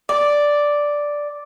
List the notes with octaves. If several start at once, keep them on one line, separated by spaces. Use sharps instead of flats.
D5